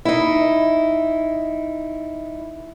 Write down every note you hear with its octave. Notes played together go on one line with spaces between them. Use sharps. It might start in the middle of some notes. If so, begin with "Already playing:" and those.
D#4 E4